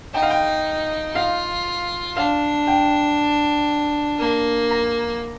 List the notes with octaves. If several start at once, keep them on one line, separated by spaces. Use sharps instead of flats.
D#4 G5
F5
G5
F4 F5
D4 F5
G5
A#3
A#5